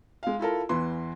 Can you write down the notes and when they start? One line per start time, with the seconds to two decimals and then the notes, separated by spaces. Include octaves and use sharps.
0.23 G#3 F5
0.39 E4 F4 A4 A#4
0.69 E2 E3 B4 C6